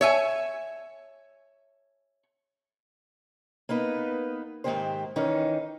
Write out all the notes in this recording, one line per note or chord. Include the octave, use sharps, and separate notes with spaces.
C#5 E5 G#5
A#3 B3 D#4 B4
G#2 D3 D#3 A#3 G4 C5
D#3 E3 C#4 D#4